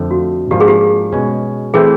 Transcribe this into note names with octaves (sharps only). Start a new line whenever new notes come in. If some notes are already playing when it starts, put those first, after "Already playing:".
Already playing: F2 D3 F3 A3 D4
F#4
G#2 F3 A#3 D4 F4 G4
G#4
G4
B2 G#3 C#4
E3 A3 C4 E4 G#4